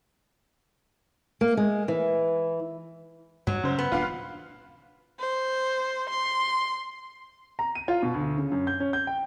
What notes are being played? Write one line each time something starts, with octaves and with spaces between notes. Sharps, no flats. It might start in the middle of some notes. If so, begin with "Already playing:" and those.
A#3
G#3
E3
G2 F#3
F#2 C#3 C5
B3
D#1 D4 F4 F5 F#5
C5
C6
A#5
D#7
F4
B2
D2
C#3
F#2
G6
C#4
G6
G5